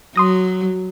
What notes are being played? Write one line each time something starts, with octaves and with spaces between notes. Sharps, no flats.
F#3 C6 D#6 A#6